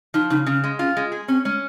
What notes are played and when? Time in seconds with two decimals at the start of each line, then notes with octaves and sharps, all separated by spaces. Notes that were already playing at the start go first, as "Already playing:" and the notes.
0.14 F3 D#4
0.30 C#3 D#4
0.46 C#3 C#4
0.64 G#3
0.79 C#4 F4
0.97 G#3
1.12 G#4
1.28 C4 C#4
1.45 G#3 C#4